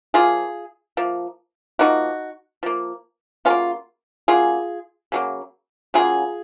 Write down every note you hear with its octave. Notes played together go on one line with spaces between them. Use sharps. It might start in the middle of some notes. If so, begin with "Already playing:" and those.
F3 A#3 F4 G#4
F3 A#3
F3 A#3 D#4 F#4
F3 A#3
C#3 F#3 A#3 C#4 F4
C#3 F#3 A#3 F4 G#4
C#3 F#3 A#3
C#3 F#3 A#3 F4 G#4